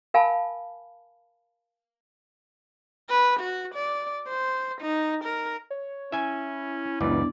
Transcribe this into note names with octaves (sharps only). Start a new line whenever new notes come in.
A#4 F5 G#5 A5 B5
B4
F#4
D5
C5
D#4
A#4
C#5
C#4 E4 E5 G#5
C#2 F#2 E3 B3 D4 D5